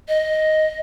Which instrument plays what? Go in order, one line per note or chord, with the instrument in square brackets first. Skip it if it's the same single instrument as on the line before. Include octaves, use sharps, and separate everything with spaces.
[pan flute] D#5